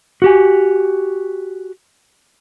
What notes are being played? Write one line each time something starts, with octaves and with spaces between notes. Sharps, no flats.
F#4 G4 G#5